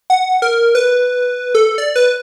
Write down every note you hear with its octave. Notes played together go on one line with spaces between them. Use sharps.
F#5
A#4
B4
A4
D5
B4